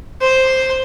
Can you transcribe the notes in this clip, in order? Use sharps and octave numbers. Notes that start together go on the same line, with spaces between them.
C5